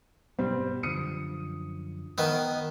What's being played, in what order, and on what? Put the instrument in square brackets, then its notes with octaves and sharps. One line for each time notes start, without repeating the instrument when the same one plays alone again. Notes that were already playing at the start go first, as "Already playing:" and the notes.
[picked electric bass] G2 B2 B3 [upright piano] G3 C4
[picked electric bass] F#2 D3 F3 [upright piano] D#6 C#7 D#7
[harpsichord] D#3 B3